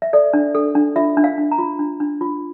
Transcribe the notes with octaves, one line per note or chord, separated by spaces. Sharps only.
E5
A4 D5
D4
A4
D4
F4 E5
D4
F5
D4
A#5
F4
D4
D4
F4